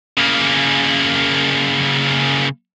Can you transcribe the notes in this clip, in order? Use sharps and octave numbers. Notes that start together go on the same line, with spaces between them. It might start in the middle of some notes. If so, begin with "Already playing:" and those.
C#3 A#3